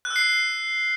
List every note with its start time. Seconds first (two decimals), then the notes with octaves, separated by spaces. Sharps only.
0.05 F#6
0.10 E6
0.16 C7